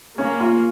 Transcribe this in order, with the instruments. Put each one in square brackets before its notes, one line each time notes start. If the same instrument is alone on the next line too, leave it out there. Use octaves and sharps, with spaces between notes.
[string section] A#3 [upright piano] C#4
[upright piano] F4